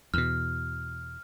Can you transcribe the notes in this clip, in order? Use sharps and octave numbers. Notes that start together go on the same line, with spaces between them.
E2 B2 F6